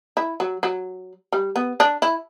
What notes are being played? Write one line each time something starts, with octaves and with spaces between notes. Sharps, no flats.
E4
F#3
F#3
G3
B3
D4
E4